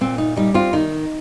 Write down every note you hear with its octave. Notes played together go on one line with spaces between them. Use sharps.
A#2 C4
D#4
G3 D#4
C4 F4
D#3 D#4